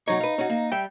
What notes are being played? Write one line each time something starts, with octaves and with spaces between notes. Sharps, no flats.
B2 F#3 D#4 C#5
B4 F5
C#4 F#4
A#3
G3 E5 G5